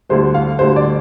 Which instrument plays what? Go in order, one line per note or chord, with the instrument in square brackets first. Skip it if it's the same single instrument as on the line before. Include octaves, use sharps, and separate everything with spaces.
[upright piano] D2 D3 G3 C5
F5
D2 D3 G3 C5
D5